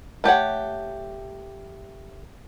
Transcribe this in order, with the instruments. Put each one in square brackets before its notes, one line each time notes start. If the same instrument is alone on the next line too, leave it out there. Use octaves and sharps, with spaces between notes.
[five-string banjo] A3 G4 C#5 F#5